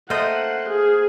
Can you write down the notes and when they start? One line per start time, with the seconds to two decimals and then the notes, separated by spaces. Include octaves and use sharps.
0.10 A3 A#3 C5 D#5 F#5
0.69 G#4